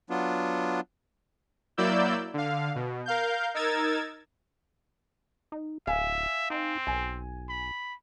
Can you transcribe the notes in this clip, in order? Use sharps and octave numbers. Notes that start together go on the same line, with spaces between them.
F#3 B3 D4 F4
F#3 A#3 E4 D5 E6 G6
D3 F5
B2
A#4 F5 G6
D#4 A#4 E6 G#6 A6
D#4
D1 E5 F5 G#5
C4 D#4
B1 G#5
B5